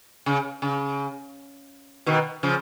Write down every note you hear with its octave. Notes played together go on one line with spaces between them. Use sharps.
C#3
C#3
B2 D#3
C#3 F3